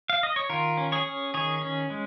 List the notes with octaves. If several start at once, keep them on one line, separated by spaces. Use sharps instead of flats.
F5
D#5
C#5
D#3 F4 A#4
C#4
G#4 C#5
C#4
D#3 G#4 C#5
C#4
G#3